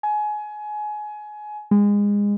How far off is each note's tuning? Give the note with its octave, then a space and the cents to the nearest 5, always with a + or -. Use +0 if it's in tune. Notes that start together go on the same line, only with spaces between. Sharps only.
G#5 +25
G#3 -25